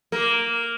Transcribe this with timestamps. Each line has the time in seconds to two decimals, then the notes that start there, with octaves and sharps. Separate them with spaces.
0.12 A#3